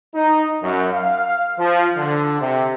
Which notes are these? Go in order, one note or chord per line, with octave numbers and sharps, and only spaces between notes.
D#4
F#2
F5
F3
D3
C3